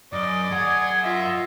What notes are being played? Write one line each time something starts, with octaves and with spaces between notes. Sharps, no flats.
F#2 D5 D#5
F#2 G#4 F#5 G#6
F4 D#5 E5